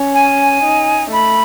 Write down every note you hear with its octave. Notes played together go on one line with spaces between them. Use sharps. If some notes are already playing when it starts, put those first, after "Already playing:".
Already playing: C#4
G#5
D#4
A3 B5